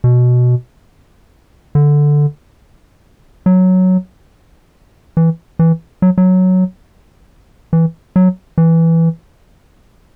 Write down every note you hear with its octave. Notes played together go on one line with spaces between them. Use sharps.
B2
D3
F#3
E3
E3
F#3
F#3
E3
F#3
E3